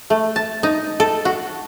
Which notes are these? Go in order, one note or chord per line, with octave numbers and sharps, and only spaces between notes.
A3
A5
D#4
A4
F#4